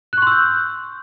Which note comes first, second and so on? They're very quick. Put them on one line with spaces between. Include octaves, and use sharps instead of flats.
F#6 C#6 C6 E6 G6